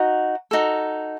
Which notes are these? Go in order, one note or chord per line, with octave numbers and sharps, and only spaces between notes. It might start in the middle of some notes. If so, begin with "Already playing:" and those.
Already playing: D#4 F#4
D#4 F#4 A4